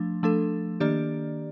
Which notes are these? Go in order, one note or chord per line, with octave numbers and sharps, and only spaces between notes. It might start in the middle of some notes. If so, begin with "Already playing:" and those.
Already playing: F3 A3 D4
F3 A3 D4 A4
D#3 A#3 D4 G4 D5